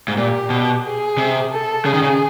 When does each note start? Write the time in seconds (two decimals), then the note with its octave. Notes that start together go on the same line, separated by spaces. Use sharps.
0.08 G#2
0.16 A#2 G4
0.50 B2
0.84 G#4
1.18 C3
1.52 A4
1.85 C#3 G#4
1.94 D#3
2.03 C#3